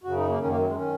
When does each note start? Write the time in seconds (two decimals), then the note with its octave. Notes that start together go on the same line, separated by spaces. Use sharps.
0.04 F#2 C#3 F#4
0.16 D#4
0.28 A#3
0.40 F#2 D#3 C#4
0.48 A#3
0.58 F#3
0.67 G#3
0.75 D#3 C#4